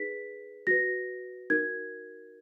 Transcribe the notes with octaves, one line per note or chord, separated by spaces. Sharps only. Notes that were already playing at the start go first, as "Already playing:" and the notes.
Already playing: D#4 G#4 B4 B6
F#4 B4 A#6
D#4 F#4 A#4 G#6